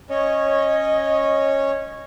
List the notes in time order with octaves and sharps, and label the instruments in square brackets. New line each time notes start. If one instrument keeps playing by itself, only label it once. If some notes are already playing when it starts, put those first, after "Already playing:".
[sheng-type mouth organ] C#4 C#5 [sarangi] D#5